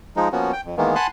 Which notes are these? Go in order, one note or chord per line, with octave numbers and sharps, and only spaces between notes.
F3 G#3 D#4
F3 A#3 B3 C#4 F#4
G5
F2
D#3 E3 G#3 A#3 B3
F#5 G#5 A5 B5 C6 F#6